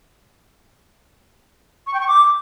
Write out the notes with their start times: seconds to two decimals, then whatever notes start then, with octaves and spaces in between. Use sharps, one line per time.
1.87 C#6
1.93 G5
2.00 C#6
2.07 D6